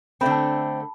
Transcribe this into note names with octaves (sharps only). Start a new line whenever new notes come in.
D3 A3 C4 B5
A5